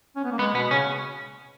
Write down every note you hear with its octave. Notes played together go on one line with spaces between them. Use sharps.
C#4
B3
A#3
G#3 B3
B2 B3
C#3 C#4